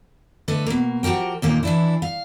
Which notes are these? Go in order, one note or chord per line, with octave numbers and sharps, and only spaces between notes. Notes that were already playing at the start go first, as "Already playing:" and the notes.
D3 A3 B4 D#5
B2 A#3
F3 F#4 G4 A#4 G5
D#2 A#2 A#3 D#4
E3 D4 E4
F5